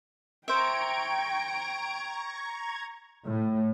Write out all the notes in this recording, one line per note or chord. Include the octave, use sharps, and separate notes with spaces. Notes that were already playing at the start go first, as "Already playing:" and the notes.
C5 E5 G5 A#5 C#6 G#6 D7
A2